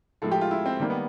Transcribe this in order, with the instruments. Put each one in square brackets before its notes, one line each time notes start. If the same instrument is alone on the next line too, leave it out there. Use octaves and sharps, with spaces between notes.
[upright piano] A2 F3 G#3 A4
G4
F4
E4
C4
D#3 G3 A#3
B3